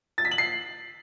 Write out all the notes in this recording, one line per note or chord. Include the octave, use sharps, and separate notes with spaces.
A6
B6
F#7
C7